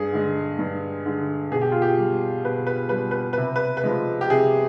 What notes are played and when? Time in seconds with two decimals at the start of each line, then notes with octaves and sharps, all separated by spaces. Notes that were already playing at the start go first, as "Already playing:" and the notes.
Already playing: G2 G#4
0.13 D3 G#3
0.59 G2
1.06 D3 G#3
1.52 B2 G#4
1.62 G4
1.72 F4
1.82 G4
1.98 G3
2.45 B2 B4
2.67 B4
2.89 G3 B4
3.11 B4
3.33 C3 B4
3.56 B4
3.77 B4
3.84 F3 G#3
4.21 G4
4.30 C3 G#4